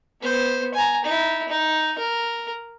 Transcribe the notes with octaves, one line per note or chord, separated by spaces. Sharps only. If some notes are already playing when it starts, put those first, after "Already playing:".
B3 C5
G#5 A#5
D#4 E4
D#4
A#4